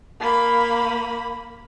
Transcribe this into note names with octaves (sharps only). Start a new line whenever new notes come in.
A#3 B5